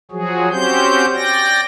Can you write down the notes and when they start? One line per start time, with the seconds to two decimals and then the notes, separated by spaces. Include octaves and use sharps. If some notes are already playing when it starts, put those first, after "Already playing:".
0.11 F3 F#3 F#4 G#4
0.51 C4 C#4 F#4 G4 C5 G6
1.15 D5 G5 A#6